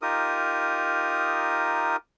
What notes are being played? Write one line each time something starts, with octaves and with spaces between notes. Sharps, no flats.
D#4 F4 G4 A#4 D#6